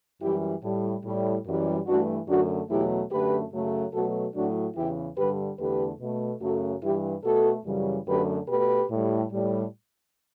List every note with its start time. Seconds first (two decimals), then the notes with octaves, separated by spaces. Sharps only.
0.22 F#2 E3 G3 E4 G4
0.63 A2 G3
1.04 A2 G3
1.46 F#2 E3 G3
1.87 G2 E3 A3 D4 F#4
2.28 F#2 D3 A3 D4 F#4
2.69 E2 B2 F#3 A3 E4 G4
3.11 F#2 D3 A3 G4 B4
3.53 F#2 C#3 F#3 A3
3.93 B2 F#3 A3 F#4 A4
4.35 A2 F#3 A3 D4 F#4
4.76 E2 C#3 E3 E4 G4
5.17 G2 D3 G3 G4 B4
5.59 E2 D3 A3 G4 B4
6.00 B2 A3
6.42 F#2 C#3 F#3 A3 F#4 A4
6.83 G2 E3 G3 E4 G4
7.24 B2 A3 F#4 A4
7.66 F#2 C#3 E3 G3
8.07 F#2 D3 F#3 A3 G4 B4
8.48 B2 A3 G4 B4
8.91 A2 G3
9.32 A2 G3